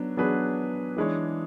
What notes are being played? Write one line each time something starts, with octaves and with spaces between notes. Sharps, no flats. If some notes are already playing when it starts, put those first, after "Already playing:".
Already playing: F#3 B3 D4
F#3 B3 D4 G#4 B4
E3 G#3 D4 G#4 C#5